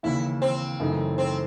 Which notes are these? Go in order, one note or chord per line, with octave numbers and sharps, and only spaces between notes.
D#2 C#3 E3 E4
C4
F#2 C#3 E3 A3 D#4
C4